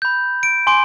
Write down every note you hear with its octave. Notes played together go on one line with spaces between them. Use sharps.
B5 G6
D7
G#5 C6 D6 D7